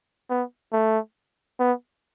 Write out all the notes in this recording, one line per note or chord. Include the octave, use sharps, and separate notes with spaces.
B3
A3
B3